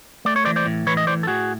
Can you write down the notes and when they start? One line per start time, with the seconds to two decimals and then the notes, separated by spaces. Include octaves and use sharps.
0.25 A3 D5
0.36 C#5
0.45 E3 C5 D5
0.56 C5 D5
0.66 A2
0.87 E3 B4 C#5
0.97 D#5
1.07 A2 C5 D5
1.23 A4
1.27 A2 F#4 G#4